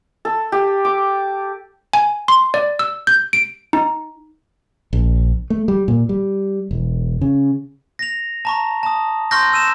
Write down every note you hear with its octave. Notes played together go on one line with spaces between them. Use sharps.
A4
G4
D6
G#5
C6
D5
E6
G6
D7
D#4
A#1
A3
G3
A#2
G3
E1
C#3
A#6 F7
A5 A#5 C#6
A5 D#6
C6 C#6 F6 G6 A#6
E6 D#7 E7